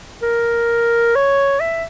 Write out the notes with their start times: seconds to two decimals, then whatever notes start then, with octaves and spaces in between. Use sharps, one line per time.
0.23 A#4
1.15 C#5
1.60 E5